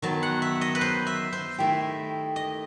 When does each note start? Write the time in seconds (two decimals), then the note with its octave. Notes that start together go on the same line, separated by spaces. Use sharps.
0.02 D#3 F#3 B3 A5
0.23 F#5
0.42 E5
0.61 D#5
0.75 B4
0.81 C5
1.07 E5
1.32 C5
1.59 D#3 A3 E4 G4
2.36 D#5